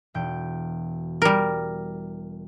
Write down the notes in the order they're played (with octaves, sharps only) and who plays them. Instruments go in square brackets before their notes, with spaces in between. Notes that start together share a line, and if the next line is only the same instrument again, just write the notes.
[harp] E1 G5
[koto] G3 A#4